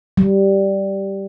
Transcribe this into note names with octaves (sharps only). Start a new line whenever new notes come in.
G3